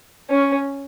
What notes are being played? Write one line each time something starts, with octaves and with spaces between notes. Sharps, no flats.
C#4